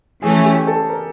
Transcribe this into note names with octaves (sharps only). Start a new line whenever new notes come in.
E3 A3 C#4 G#4
G4
A4
A#4